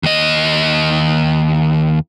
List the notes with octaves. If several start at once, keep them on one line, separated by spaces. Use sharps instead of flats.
D#2 D#5